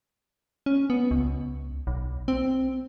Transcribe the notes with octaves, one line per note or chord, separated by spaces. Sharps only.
C#4
B3
C#2
B1
C4